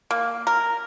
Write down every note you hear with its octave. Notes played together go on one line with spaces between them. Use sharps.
A#3
A#4